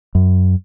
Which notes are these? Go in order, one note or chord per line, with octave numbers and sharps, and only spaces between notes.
F#2